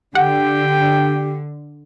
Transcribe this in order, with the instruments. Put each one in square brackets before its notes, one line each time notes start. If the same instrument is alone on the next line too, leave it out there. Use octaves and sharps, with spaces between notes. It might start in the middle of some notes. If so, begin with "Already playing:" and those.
[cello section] D3 [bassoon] G4 [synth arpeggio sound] F#5 [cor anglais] G5